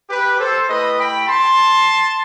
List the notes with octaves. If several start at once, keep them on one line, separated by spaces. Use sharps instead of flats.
G4 B4
A4 C5
A3 E4 G4 B4 D#5
G5 B5
A5 C6